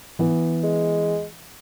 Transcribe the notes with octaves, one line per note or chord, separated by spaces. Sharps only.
E3 B3
G#3